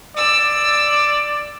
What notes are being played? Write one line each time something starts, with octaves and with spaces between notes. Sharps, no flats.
D5 E6